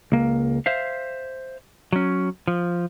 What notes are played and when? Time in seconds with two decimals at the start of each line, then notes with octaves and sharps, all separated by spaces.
0.12 C#2 A#3
0.66 C5 E5 F5
1.93 F#3 C#4
2.48 F3